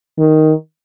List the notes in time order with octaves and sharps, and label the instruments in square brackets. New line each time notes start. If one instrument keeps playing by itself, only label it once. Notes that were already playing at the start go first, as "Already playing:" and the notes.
[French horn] D#3